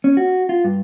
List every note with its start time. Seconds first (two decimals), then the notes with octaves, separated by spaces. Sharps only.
0.04 C#4
0.17 F#4
0.49 F4
0.64 G2